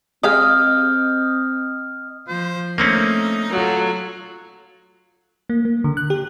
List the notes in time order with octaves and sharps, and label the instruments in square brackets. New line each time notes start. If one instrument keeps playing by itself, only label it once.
[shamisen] G#3 G4 F5 [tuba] C4 [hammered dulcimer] D#5 G5 [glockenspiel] D#6 F6
[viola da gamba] F3 [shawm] C5
[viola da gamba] A3 [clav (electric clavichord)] A#3 C4 C#4 [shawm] D#4
[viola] F#3 [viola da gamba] F4 A4
[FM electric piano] A#3
A#3
D3
F#6
G4